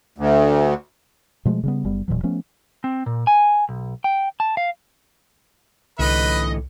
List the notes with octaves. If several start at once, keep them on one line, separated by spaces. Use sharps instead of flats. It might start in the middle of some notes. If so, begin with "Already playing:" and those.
D2
B2 F3 G#3 A3
C#3 G3 B3
F#1 G3 B3
E1 A#2 E3 F#3
F3 A3 B3 C#4
C4
A#2
G#5
B1
G5
A5
F5
C2 A2 D3 E3 B4 D#5